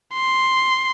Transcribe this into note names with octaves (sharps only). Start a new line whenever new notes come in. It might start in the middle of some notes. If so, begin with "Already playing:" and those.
C6